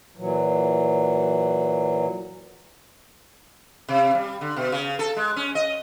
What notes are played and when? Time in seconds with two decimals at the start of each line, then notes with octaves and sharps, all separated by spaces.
0.17 A#2 E3 F#3
3.89 C3
4.15 G3
4.41 D3
4.56 B2
4.72 C#3
4.99 A4
5.16 G#3
5.36 C#4
5.55 D#5